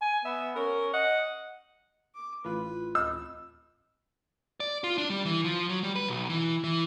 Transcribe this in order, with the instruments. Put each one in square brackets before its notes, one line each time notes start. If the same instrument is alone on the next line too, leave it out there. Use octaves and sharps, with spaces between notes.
[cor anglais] G#5
[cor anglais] B3 [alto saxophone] E5
[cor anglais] C#4 [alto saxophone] A#4
[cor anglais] D#5 [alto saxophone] F#5
[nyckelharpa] D6
[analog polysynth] A1 F4 [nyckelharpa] B4
[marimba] D2 [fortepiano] E6
[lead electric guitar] D5
F4
D4
G3
E3
F3
F#3
G3
B4
B1
E3
E3